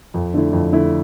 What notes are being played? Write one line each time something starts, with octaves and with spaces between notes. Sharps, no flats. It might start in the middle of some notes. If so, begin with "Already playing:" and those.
F2
D3 A3 E4
F2
D3 A3 E4